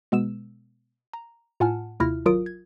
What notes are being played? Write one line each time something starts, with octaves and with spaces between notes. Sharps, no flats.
B2 G#3 B3 E6 E7
A#5
A2 F4 F#5 G#5 A5 F6
D#2 C3 E4 F4 F6 A#6
G#1 F#3 F4 A#4 D#6 D7
G#6